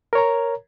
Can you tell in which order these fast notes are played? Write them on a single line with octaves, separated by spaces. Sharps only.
A#4 C#5 A#5